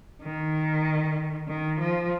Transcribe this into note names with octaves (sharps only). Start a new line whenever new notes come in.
D#3
D#3
F3